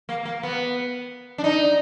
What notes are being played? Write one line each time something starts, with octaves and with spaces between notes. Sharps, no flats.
A#3
A#3
B3
D4
D#4